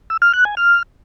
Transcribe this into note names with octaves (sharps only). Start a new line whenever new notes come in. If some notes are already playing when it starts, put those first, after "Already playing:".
E6
F6
F#6
G#5
F6